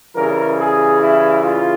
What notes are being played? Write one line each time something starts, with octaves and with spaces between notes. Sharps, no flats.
C#3 E3 G3 A#4
G#4
E4
F4